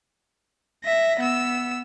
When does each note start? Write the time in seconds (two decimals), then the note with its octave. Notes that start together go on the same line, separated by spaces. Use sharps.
0.84 E5 A#6
1.20 B3 E6